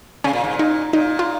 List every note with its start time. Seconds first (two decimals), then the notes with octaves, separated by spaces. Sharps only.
0.24 C#3 C#4
0.33 A#2
0.44 G#2
0.53 A#2
0.59 D#4
0.93 A#2 D#4
1.19 F4